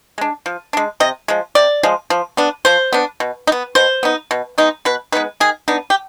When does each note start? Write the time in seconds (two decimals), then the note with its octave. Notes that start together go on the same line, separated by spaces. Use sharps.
0.18 G#3 D4
0.46 F3
0.73 G#3 D4
1.00 C3 D#5
1.28 F3 G#3
1.55 C3 D5
1.83 F3 G#3
2.10 F3
2.37 B3 D4
2.65 F3 C5
2.93 B3 D4
3.20 B2
3.47 D#4
3.52 B3
3.75 B2 C5
4.03 B3 D#4
4.31 B2
4.58 G#3 B3 D#4
4.85 B2 B4
5.12 G#3 B3 D#4 B4
5.40 D#3 G#4
5.68 B3 D4 D#4
5.90 G4